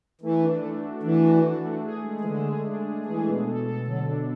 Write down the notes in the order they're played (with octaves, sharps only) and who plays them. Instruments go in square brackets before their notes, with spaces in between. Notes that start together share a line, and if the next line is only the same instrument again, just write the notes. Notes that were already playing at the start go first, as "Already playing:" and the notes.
[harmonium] E3 [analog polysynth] A3
[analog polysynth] D4
A3
F#4
[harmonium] E3 [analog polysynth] D4
[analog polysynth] F#4
D4
A3
G#4
G#3
[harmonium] E3
[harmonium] D3 [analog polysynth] G#3
[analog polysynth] G#4
D4
G#4
[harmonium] E3 [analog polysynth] G#4
[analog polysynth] B2
A4
A4
[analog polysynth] D3 [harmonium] F#3
[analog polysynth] D4